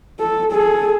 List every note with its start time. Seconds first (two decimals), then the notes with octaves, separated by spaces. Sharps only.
0.19 A4
0.52 G#4 A4